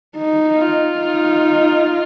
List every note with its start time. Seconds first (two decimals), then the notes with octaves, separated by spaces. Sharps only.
0.18 D#4
0.58 F4
0.99 D#4